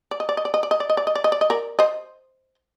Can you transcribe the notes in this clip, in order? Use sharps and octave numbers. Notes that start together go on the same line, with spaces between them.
D5
D#5
D5
D#5
D5
D#5
D5
D#5
D5
D#5
D5
D#5
D5
D#5
D5
D#5
A#4 D5
C5 D#5